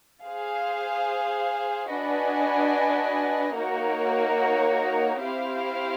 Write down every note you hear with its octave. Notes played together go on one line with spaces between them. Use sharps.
G#4 C5 F5
D4 F#4 B4 D#5 G#5
A#3 D#4 F#4 A#4 C#5
C4 E4 G4 C5 F5